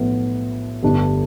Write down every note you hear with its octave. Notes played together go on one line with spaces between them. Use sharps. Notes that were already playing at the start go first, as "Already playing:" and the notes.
Already playing: B1 A2 F3 B3
G1 G2 D3 A3 D4